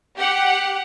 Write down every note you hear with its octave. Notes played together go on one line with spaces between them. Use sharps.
G4 F#5